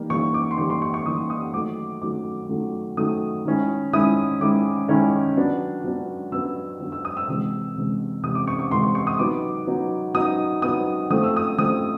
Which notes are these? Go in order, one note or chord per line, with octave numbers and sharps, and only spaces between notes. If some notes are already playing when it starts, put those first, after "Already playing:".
Already playing: E3 G3 A#3 D#4
E3 G3 A#3 D#4 C#6
D6
C6
E3 G3 A#3 D#4 C#6
C6
C#6
C#6
E3 G3 A#3 D#4 D#6
D#6
D#3 F#3 A3 D6
D#3 F#3 A3 D6
D#3 F#3 A3
D#3 F#3 A3 D#6
D#3 G#3 C#4 E4
D#3 G#3 C#4 E4 D#6
D#3 G#3 C#4 E4 D6
D#3 G#3 C#4 E4
F#3 B3 D4
F#3 B3 D4
F#3 B3 D4 E6
F#3 B3 D4
E6
D#6
E6
C3 E3 G#3
C3 E3 G#3
C3 E3 G#3 D#6
D6
C#6
C#6
C3 E3 G#3 C6
C#6
C#6
D#6
F#3 B3 D#4 D6
F#3 B3 D#4
F#3 B3 D#4 D#6
F#3 B3 D#4 D#6
F3 A3 C4 D#6
E6
D#6
F3 A3 C4 D#6